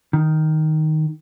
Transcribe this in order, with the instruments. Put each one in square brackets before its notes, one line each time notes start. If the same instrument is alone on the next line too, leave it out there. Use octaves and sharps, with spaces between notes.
[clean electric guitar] D#3